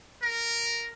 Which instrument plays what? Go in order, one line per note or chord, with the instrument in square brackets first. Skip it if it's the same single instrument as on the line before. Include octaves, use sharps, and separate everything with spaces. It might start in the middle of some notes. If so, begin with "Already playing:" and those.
[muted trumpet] A#4